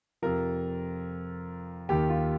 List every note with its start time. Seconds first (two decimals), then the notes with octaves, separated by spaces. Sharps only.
0.22 F2 C3 F3 A#4
1.89 D#2 D#3 G4
2.09 F4